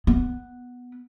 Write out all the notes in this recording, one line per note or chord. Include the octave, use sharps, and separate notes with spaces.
B3